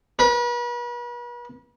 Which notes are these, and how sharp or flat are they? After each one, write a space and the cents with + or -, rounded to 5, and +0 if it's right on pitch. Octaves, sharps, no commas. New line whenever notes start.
B4 -40